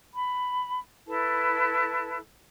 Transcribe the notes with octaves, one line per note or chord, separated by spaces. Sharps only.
B5
E4 A4 B4 A5